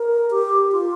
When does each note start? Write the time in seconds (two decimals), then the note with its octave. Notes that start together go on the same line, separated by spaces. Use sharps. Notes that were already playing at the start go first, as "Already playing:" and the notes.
Already playing: A#4
0.31 G4
0.72 F4